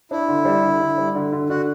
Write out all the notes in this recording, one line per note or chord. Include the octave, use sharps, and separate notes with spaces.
D4 E4
D3
G3
D3
D3
G3
D3
D3
D3 F#4